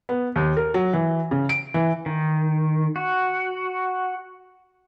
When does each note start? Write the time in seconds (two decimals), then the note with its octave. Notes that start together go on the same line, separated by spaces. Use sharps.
0.09 B3
0.36 D#2
0.57 A#4
0.74 F#3
0.93 E3
1.31 C#3
1.49 D7
1.74 E3
2.06 D#3
2.96 F#4